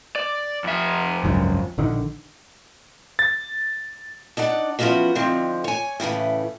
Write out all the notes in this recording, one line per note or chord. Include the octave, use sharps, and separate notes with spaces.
D5
F2 E5
G#1 C#2 F#2
A#1 D3 D#3
A6
D4 D#4 D5 F#5
E3 F3 G#3 B3 C#4 F#4
D3 D#3 F3 C4
C#5 G#5
A2 C#3 E3 A3